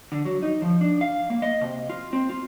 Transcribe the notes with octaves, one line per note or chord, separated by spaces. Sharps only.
D3
F#3
D#4
F3
D4
F5
A#3
D#5
C3
F4
C4
F4